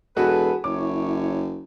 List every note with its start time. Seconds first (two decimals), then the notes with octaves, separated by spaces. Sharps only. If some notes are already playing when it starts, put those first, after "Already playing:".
0.17 E1 F#4 G#4 A4 B4
0.64 F#1 E4 C#5 D6